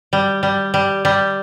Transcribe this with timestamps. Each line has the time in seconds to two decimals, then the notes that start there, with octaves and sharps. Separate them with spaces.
0.13 G3
0.43 G3
0.74 G3
1.05 G3